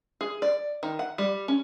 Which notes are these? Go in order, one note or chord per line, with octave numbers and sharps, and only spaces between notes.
G#4
D5
D#3
F#5
G3
C#4